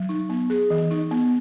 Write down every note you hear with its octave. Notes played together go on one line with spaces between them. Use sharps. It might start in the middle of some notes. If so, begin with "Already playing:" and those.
Already playing: F#3
D#4
B3
G#4
E3
D#4
B3